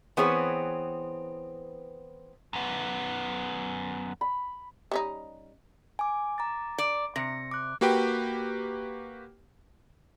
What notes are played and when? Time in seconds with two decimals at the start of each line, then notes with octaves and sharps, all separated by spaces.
0.17 E3 B3 C4 G#4 C#5
2.53 F#2 B3
4.21 B5
4.91 G3 C#4 D#4
5.99 G#5 D6
6.38 A#5 D6 A6
6.78 D5
7.16 C3 A#6 C#7
7.51 D6 F#6
7.81 A#3 F#4 G4 B4 G5